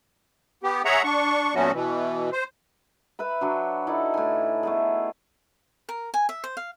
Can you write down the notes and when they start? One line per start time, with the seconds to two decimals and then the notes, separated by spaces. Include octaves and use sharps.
0.63 B3 G4
0.85 G#4 C#5 E5 F#5 A#5
1.04 D4 C#6
1.55 A#2 F#3 A3 B3 C#4 F#4
1.74 B2 E3
2.32 C5
3.19 B4 E5 B5
3.41 F#3 D4 C#5
3.87 D#4 E4 A4 D5
4.14 A2 G#5
4.63 A3 B3 G#4
5.89 A#4
6.14 G#5
6.29 E5
6.44 C5
6.57 F5